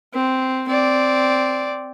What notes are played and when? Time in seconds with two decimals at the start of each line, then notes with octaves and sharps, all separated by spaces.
0.14 C4
0.68 C4 D5